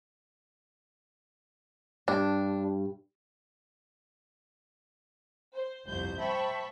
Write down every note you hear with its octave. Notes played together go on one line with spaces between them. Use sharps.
G2 D4
C5
G1 C2 F2 C5 G6
C5 E5 G5 A5 B5 C#6